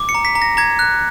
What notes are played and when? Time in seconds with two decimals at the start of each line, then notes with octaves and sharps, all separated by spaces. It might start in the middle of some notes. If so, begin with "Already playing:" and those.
Already playing: D6
0.09 C#7
0.15 A#5
0.25 B6
0.35 A#5
0.42 A#6
0.57 A#5 G#6
0.79 F#6